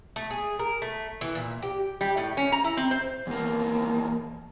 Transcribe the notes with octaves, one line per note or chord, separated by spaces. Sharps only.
A3
G#4
A#4
A3
E3
A#2
G4
G3
A2
C#4
A#5
E4
C4
C5
E2 A#3